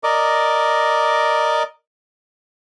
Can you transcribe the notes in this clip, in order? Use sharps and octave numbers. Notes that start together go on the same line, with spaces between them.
A#4 D5 D#5 D6